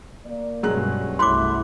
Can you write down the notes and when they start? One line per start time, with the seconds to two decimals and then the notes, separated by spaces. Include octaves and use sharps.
0.25 A#3 D5
0.63 B1 G2 F#3 G#3 C#4 F#6
1.19 C2 F#3 A3 E4 B5 C6 D6 F#6